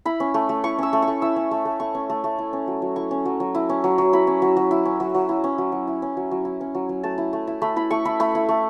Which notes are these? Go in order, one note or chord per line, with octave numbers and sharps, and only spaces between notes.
E4 B5
C#4
A3
A3
E4 C#6
C#4 E6
A3
C#6
A3
E4 E6
C#4
A3
A3
E4 C#6
C#4
A3
A3
E4
C#4
F#3
F#3
E4 C#6
C#4
F#3
F#3
E4
C#4
F#3
F#3
E4 B5
C#4
F#3
F#3
E4
C#4
F#3
F#3
E4
C#4
F#3
F#3
E4
C#4
F#3
F#3
E4
C#4
F#3
F#3
A3 A5
E4
A3
E4
A3 B5
E4 B5
A3 C#6
E4 B5
A3 B5
E4
A3